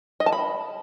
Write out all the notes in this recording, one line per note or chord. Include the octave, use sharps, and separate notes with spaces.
D#5
A5
B5